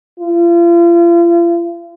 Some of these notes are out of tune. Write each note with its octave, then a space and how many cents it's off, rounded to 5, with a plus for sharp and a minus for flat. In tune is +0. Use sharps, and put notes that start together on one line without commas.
F4 -40